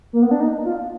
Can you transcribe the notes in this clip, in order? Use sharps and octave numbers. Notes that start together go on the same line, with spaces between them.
A#3
B3
D4
D#4
F4